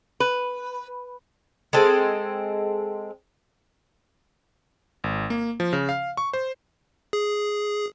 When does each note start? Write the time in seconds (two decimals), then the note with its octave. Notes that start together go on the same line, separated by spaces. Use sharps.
0.20 B4
1.73 G#3 C4 A4
5.04 G#1
5.30 A#3
5.60 F3
5.73 C#3
5.89 F5
6.17 C#6
6.33 C5
7.13 G#4